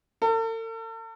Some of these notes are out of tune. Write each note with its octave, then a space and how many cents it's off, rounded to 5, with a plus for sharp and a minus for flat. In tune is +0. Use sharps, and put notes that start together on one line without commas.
A4 +45